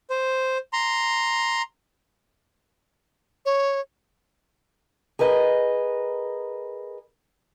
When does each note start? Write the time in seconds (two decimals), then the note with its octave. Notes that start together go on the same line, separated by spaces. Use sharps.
0.10 C5
0.73 A#5 C6
3.46 C#5
5.19 G#4 A#4 B4 D#5